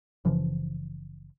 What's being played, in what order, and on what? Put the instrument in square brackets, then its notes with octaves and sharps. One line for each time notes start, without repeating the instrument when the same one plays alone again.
[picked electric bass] F#1 C#3 E3 F3